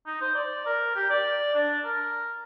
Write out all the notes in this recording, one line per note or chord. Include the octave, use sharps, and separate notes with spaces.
D#4
C5
D5
A#4
G4
D5
D4
A#4